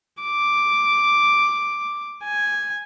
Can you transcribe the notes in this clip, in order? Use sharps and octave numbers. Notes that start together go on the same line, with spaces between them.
D6
G#5